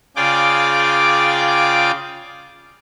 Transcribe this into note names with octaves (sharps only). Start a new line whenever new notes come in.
C#3 F4 G#4 D5 G5 D6